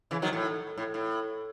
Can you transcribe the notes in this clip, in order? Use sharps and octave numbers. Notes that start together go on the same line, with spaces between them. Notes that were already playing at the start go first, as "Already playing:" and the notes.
C#3 E3
D#3 F#3
A2
A2
A2